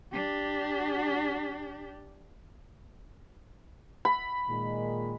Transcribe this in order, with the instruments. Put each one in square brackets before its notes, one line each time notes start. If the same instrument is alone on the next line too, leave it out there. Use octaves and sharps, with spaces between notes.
[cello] D4 G4
[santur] B5
[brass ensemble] A#2 D#3 G#3